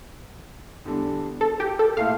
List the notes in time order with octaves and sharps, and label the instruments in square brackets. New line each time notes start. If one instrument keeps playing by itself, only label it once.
[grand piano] E2 D3 G3 D4 A4
[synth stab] A4
G4
A4
[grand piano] A#2 A3 E4 [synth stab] F5